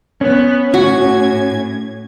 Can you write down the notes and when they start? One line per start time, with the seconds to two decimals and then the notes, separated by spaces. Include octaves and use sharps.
0.21 B3 C#4
0.74 A2 F#4 G#6